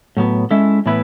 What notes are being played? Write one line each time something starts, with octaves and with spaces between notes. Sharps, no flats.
A2 F#3 B3
G#3 C#4 E4 A4 E5
A2 E3 B3 E4 B4